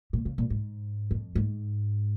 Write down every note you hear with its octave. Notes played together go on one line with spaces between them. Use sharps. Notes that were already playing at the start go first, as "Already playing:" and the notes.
A#2
C#3
A#2
G#2
F2
G#2